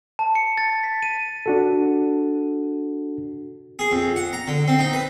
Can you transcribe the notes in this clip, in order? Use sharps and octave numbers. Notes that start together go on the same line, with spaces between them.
A5
C#7
A6
B6
D#7
D4 F#4 A4
G#4
F2
F#5
A#5
D3
C4
D#4
B4